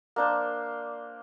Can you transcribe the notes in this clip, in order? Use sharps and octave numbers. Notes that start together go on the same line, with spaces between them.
A#3 D4 C5